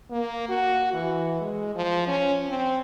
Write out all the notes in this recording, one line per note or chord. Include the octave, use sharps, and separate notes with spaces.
A#3
F#4
E3
G#3
F3
C#4
C4